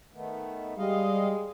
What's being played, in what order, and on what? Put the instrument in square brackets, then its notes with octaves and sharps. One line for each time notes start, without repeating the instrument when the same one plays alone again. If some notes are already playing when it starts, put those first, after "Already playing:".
[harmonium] D#3 A3 B3
[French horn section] G3 [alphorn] G#3 [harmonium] D#5 F5